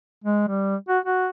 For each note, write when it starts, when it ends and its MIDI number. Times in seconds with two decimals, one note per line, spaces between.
0.24 0.48 56
0.48 0.76 55
0.88 0.99 66
1.06 1.28 66